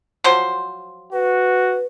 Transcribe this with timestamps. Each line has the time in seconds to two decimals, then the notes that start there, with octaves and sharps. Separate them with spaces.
0.24 F3 F#3 C5
1.12 F#4 B4